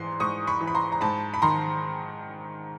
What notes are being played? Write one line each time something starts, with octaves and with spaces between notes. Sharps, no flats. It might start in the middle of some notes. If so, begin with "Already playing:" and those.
Already playing: G#2 E3 C6
G#2 C#6 D#6
B5 C#6
E3
B5
A#5 C6
A#5
G#2 A5 B5
B5
D#3 A#5 C6